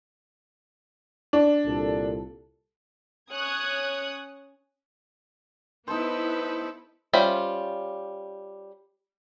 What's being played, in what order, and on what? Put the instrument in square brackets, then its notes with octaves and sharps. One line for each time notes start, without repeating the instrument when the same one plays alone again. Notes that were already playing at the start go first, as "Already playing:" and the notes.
[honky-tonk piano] D4
[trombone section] C2 A#2 A4
[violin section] C#4 C#5 D#6 F#6 G#6
[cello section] B3 E4 [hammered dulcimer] D#4 C5 [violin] A4 B4
[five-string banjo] G3 C#4 F4 C5 E5